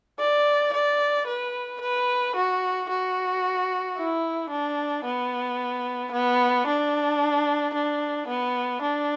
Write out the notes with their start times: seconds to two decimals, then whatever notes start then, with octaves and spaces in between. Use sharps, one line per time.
0.19 D5
0.73 D5
1.27 B4
1.81 B4
2.36 F#4
2.89 F#4
3.97 E4
4.50 D4
5.04 B3
6.12 B3
6.67 D4
7.74 D4
8.27 B3
8.82 D4